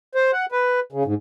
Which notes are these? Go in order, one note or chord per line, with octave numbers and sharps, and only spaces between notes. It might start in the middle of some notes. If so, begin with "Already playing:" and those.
C5
F#5
B4
C#3
G#2